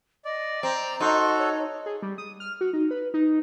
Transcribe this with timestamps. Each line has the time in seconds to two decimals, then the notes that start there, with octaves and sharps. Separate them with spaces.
0.25 D5 D#5
0.63 C4 A#5
1.00 D#4 F#4 A4 C6
1.38 C#5
1.86 G#4
2.02 G3
2.18 D#6
2.40 F6
2.61 F#4
2.73 D#4
2.91 B4
3.14 D#4